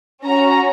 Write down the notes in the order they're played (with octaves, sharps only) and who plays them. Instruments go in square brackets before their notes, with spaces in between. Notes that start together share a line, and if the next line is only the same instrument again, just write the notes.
[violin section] C#4 F#4 A#5